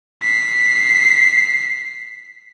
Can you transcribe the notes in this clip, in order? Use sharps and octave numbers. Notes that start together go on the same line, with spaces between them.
B6 C7